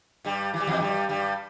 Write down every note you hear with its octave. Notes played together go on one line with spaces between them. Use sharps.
G2 G3
E3
G3
E2 E3
G2 G3
G2 G3